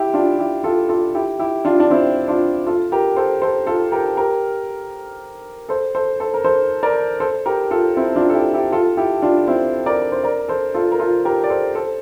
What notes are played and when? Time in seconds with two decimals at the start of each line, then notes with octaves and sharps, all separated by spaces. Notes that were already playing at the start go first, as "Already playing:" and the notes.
Already playing: E4 G4
0.14 D4 F4
0.39 E4 G4
0.64 F4 A4
0.89 F4 A4
1.15 E4 G4
1.39 E4 G4
1.65 D4 F4
1.80 D4
1.90 C4 E4
2.28 D4 F4
2.67 F4 A4
2.92 G4 A#4
3.16 A4 C5
3.42 A4 C5
3.67 F4 A4
3.92 G4 A#4
4.17 G4 A#4
5.69 A4 C5
5.95 A4 C5
6.20 A4 C5
6.34 A#4
6.44 A4 C5
6.83 A#4 D5
7.20 A4 C5
7.46 G4 A#4
7.71 F4 A4
7.97 C4 E4
8.16 D4 F4
8.30 A4
8.34 E4 G4
8.54 E4 G4
8.72 F4 A4
8.97 E4 G4
9.22 D4 F4
9.47 C4 E4
9.86 A#4 D5
10.12 C5
10.23 A#4 D5
10.48 A4 C5
10.74 F4 A4
10.92 A#4
10.99 F4 A4
11.25 G4 A#4
11.44 D5
11.49 A4 C5
11.75 A4 C5